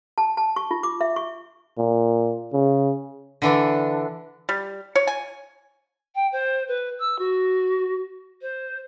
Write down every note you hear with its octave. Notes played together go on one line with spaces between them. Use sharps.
A5
A5
C#6
F4
D6
E5
C#6
A#2
C#3
D3 E3 D4
G3
C#5
G#5
G5
C5
B4
E6
F#4
C5